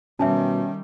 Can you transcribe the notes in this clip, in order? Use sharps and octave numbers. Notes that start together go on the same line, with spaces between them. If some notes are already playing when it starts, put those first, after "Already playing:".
B2 D#3 G3 C#4 E5 G#5 A5